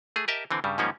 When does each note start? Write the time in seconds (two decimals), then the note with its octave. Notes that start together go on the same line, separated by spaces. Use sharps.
0.16 A3 G#4
0.28 G4 A#4 D#5 E5 A5
0.51 D3 E3 C4
0.64 G2 C#3 G3
0.78 G#2 D#3 F3 G3 A#3 C#4